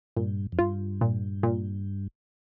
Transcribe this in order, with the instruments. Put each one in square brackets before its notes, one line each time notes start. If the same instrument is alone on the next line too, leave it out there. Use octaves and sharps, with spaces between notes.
[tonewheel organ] G2 [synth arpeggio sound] A#2
[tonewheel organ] F2
[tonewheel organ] G2 [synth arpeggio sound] F4
[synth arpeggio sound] A#2
A#2